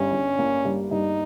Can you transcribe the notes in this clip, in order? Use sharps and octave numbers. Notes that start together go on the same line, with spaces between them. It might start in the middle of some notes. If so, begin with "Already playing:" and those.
Already playing: G1 G2 C#4
G1
A#3
G2
G2 D#4